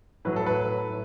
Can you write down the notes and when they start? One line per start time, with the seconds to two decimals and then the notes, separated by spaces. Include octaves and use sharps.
0.25 A2 F#3 B4
0.36 A4
0.46 B4
0.89 A2